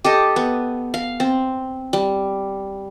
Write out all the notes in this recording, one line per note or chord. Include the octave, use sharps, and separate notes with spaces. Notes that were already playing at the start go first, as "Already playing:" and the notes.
G4 A4 D#5
B3
F5
C4
G3